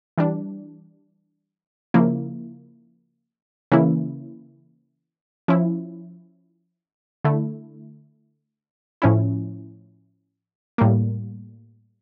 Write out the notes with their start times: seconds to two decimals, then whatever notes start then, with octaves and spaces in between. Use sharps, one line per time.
0.18 E3 G3 D4
1.94 C#3 F3 A#3 E4
3.72 C#3 E3 A#3 C#4 E4
5.48 F3 C#4 E4
7.25 D3 A3 E4
9.02 A2 F3 C#4 E4
10.78 A2 G3 A#3